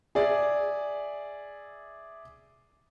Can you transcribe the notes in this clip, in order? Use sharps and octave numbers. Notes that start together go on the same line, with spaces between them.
G#4 D5 E5